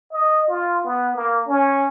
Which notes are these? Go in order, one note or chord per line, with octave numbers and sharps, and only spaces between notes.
D#5
F4
B3
A#3
C#4